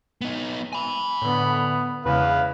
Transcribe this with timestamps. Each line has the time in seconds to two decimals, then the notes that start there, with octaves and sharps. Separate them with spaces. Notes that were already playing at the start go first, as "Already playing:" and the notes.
0.21 B3 D#4
0.73 G#5 B5
1.22 A2 D3 B3
2.05 E2 C#3 B4 F5